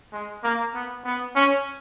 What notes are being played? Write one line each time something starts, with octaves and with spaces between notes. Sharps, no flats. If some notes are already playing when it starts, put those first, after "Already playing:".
G#3
A#3
B3
B3
C#4